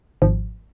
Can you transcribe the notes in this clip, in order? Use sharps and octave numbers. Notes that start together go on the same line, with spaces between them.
G#1 G#2 F3